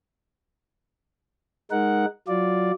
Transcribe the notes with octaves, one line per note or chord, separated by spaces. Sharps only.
G#3 D#4 A#4 F#5
F#3 F4 D5